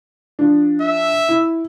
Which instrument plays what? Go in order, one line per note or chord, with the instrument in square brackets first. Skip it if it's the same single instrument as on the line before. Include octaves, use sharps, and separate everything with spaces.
[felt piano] F3 D4
[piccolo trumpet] E5
[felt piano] E4